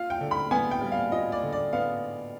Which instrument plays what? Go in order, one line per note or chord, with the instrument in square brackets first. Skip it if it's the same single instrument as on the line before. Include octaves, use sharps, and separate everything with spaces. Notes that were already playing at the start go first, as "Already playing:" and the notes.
Already playing: [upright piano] F4 F5
G5
D3
B5
B3 G#5
G5
G3
F5
F4 D#5
D5
D3
D5
B3 F5